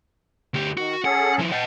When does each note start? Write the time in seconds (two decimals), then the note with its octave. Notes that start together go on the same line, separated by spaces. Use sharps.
0.54 D2 G4
0.77 D#3 F#4
1.05 C#4 G#4 A4 F#5
1.39 F3 E4
1.52 D#5 F#5 G5 A5